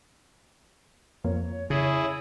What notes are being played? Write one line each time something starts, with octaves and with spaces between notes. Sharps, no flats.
F2 A#3 C#5
C#3 E4 G#4